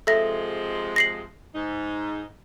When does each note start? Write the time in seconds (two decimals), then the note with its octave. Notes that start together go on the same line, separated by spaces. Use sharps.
0.07 C3 F3 G#3 A4 E5 A#6
0.96 A#6 C7 F#7
1.54 G#2 D#4